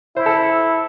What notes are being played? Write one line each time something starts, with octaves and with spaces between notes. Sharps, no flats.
E4 C5
A4